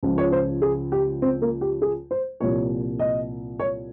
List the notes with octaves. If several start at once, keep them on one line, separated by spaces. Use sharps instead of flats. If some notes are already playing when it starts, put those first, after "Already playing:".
C#2 C#3 F3
C#5
C5
G#4
G4
C4
A#3
G4
G#4
C5
C2 A#2 F3 C#5
D#5
C#5